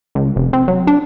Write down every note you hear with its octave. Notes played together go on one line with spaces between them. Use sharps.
C#2
F1
C4
F#3
D4